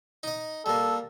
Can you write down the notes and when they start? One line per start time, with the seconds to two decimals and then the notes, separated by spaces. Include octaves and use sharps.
0.23 D#4 D#5
0.66 G3 A#3 A4